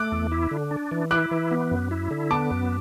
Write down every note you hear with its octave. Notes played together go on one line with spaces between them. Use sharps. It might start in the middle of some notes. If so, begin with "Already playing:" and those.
Already playing: A3 D6 F#6
E2
E4
D3
D4
E3
E4 D6 F#6
E3
B3
F#2
E4
D3
B3 A5 D6
F#2